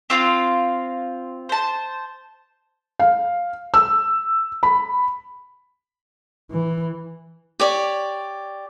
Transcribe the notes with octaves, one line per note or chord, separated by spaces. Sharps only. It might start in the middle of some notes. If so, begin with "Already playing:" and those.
C4 F4 F5
C5 A5
F5
E6
B5
E3
G4 C#5 D5